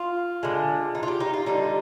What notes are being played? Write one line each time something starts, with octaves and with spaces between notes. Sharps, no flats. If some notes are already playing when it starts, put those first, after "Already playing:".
Already playing: F4
D3 G#3
D#4
F4
G4
D#4
F4
D3 G3 D#4